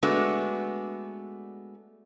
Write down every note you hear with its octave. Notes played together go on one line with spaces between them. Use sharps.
G#3 A3 B3 D4 F#4